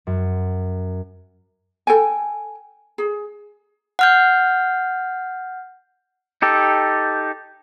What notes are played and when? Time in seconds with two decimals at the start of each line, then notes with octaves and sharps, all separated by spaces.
0.07 F#2
1.87 A4 G5 G#5
2.98 G#4
3.99 F#5 F6 G6
6.42 D#4 G4 A4